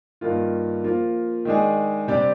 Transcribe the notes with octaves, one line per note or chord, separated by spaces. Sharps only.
G2 D#3 A#3 F4
F3 A#3 F4
D#3 G#3 D4 G#4
C3 G3 D4 G4 D5